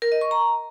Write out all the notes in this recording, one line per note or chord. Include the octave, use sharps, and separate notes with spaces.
A#4
D#5
C#6
A#5